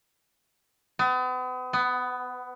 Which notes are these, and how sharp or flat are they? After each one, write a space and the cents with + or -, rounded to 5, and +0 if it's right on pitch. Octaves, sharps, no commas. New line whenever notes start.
B3 +40
B3 +15